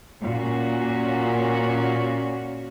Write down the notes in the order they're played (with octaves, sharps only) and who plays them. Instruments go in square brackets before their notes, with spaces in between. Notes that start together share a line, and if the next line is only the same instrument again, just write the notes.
[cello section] A#2 C#4 F#4